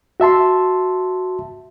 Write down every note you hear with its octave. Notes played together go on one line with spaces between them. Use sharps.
F#4 E5 A5 C6